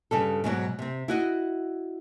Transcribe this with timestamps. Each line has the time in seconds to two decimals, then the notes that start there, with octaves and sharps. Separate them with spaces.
0.11 G2 C#3 G3 A4
0.44 G#2 B2 D#3 F#3
0.79 C3 C4
1.08 E4 F#4 D#5